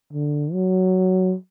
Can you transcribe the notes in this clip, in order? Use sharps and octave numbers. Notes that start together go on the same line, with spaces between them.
D3
F#3